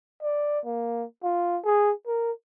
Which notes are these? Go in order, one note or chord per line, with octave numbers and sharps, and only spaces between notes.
D5
A#3
F4
G#4
A#4